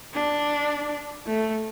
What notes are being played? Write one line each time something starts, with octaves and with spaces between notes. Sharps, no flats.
D4
A3